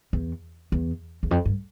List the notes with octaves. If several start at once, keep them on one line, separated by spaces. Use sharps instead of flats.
E2
E2
E2
F2
G2